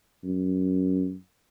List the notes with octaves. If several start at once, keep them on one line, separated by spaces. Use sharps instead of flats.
F#2